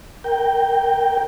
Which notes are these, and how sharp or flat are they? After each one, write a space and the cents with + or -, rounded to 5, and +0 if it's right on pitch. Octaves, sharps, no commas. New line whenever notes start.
A#4 +0 G5 +0